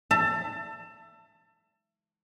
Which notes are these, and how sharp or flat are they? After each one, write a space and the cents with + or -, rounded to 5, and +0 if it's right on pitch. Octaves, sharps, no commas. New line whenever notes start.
E5 +25 A5 +30